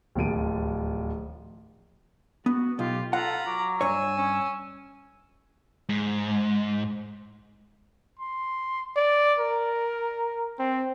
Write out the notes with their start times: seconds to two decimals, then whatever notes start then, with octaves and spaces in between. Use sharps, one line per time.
0.15 D1 D#2 F3 D7 D#7
2.46 B3 F#4
2.79 B1 F4 G4
3.13 F4 A4 F#5 A#5 B5
3.47 F#3 D6
3.81 G2 C#5 G#5 E6
4.18 C#4
5.89 G#2
8.19 C6
8.96 D5
9.39 A#4
10.59 C4